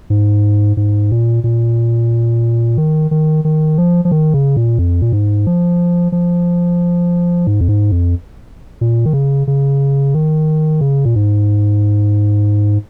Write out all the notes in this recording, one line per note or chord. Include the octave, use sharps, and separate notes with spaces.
G#2
G#2
A#2
A#2
D#3
D#3
D#3
F3
F3
D#3
C#3
A#2
F2
A#2
G#2
F3
F3
G#2
F2
G#2
F2
A#2
D#3
C#3
C#3
D#3
C#3
A#2
G#2